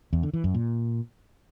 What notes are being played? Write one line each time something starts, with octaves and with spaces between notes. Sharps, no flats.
E2
D3
E3
F#2
A#2